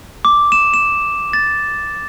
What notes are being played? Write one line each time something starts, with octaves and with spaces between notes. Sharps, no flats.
D6
E7
E7
A6